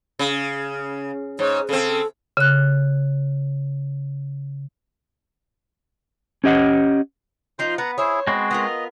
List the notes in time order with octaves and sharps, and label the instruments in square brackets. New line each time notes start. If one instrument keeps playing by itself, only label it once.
[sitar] C#3
[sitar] G#2 [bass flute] C#5
[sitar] C#3 C4 [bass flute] A4
[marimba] C#3 F#6
[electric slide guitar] C#4 G4 D#5 F#5
[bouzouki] F3 D#4 F4 [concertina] C5 C6
[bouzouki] B3 [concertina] F#5 A#5
[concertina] E4 G#4 [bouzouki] C5 C#5
[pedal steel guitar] G#3 C4 F#4 [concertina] B3
[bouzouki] B3 F4 A#4 [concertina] D#5